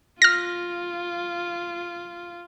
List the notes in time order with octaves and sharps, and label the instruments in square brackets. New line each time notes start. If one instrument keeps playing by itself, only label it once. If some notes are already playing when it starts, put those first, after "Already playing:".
[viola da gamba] F4 [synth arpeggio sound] F6 A#6